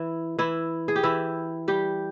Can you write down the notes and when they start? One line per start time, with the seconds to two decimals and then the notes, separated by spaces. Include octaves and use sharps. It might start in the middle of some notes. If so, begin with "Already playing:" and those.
Already playing: E3 E4
0.38 E3 E4
0.88 G#4
0.96 G4
1.03 E3 E4
1.68 G3 G4